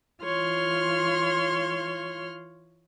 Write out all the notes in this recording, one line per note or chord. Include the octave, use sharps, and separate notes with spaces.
E3 F4 C#5 C6 F6